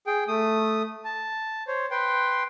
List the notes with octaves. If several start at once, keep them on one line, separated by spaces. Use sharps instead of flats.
G#4 G5
A3 D#6
A5
C5 C#5
B4 G5 C6